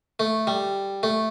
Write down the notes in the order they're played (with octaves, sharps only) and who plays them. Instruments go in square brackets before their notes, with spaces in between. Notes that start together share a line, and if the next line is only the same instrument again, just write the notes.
[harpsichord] A3
G3
A3